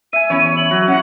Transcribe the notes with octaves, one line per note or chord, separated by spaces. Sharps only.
E5 G#5 D#7
E2 C#4 E4 C#5 B5
F#7
F#3 F#4
C#4 E4 F#5